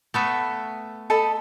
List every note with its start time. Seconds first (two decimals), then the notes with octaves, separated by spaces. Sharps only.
0.14 A3 B3 E5
1.10 A4 D#5 B5